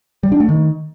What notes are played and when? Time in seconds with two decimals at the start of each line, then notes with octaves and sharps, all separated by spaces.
0.23 G3
0.32 D4
0.40 A3
0.49 D#3